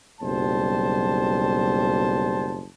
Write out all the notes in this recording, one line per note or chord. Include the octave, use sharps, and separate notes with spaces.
F#1 B1 G3 C5 A5